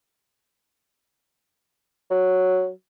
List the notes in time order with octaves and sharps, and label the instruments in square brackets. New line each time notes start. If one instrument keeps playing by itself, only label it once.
[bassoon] F#3